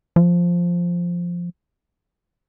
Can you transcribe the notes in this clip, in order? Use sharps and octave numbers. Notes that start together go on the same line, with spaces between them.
F3